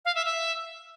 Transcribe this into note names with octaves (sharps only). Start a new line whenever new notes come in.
F5
E5
E5